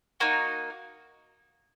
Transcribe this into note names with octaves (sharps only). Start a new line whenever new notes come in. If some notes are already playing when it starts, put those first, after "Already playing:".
A#3 D#4 F#4